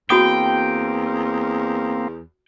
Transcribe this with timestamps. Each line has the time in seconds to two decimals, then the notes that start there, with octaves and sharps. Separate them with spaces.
0.10 E2 A#3 C4 F#4 G5 B5 D#6